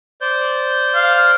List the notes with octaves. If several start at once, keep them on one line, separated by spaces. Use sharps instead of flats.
C5 D5 G6
F5